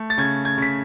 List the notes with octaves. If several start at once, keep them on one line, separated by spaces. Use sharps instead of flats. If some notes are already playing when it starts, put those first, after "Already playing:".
Already playing: A3
A6
C#3 G#6
G#6
C#3 B6